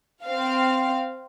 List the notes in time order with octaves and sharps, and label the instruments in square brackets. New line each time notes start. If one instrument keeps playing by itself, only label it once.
[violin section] C4 F5